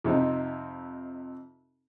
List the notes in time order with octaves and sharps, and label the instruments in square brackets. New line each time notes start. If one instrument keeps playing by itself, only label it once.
[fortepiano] F2 C3 C4 D#4